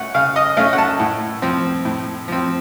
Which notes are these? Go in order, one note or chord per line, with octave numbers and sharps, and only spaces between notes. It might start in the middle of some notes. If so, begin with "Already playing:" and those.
Already playing: A3 C#4 F#5
C#3 F5
D#5
A3 C#4 F5
F#5
A5
A2
F3 C4
A2
F3 C4